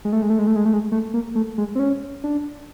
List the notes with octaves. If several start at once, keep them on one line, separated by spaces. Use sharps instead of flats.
G#3
A3
G#3
A3
G#3
A3
G#3
A3
G#3
A3
A#3
A3
G#3
C4
C#4
D4